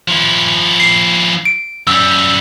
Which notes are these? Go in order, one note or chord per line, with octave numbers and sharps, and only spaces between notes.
F3 E4
C7
D7
F#2 G3 E6